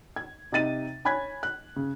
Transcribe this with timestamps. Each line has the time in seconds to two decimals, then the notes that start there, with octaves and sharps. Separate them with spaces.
0.16 G#6
0.52 C3 D#4 A6 D#7
1.05 C#5 G#5 B5 F#6 G#6 B6
1.43 F#6
1.76 C#3